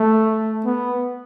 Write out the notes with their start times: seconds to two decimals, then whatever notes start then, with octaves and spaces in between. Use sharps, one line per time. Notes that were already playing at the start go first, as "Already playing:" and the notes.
Already playing: A3
0.65 B3